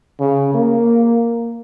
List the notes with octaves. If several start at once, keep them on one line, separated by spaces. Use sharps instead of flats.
C#3
A#3